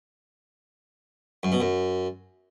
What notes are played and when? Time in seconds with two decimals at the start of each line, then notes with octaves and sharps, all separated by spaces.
1.43 F#2
1.52 B2
1.60 F#2